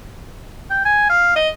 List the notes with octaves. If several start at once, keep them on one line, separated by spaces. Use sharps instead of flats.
G5
G#5
F5
D#5